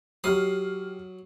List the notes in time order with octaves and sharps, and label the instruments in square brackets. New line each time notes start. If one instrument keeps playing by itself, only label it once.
[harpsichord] F#3 D#6 [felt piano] G4 F6 C7